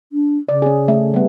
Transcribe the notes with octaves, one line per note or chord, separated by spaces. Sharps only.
D4
C#3 D5
C#4 G#4
A3
G3 B3